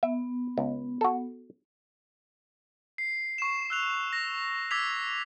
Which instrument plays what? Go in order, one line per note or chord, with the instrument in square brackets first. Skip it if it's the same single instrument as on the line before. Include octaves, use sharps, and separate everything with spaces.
[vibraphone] B3 [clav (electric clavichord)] E5
[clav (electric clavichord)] C#2
F#4 A4
[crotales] C7
C#6 C7 E7
E6 F#6 F7
A#6
D6 E6 G#6 B6 F7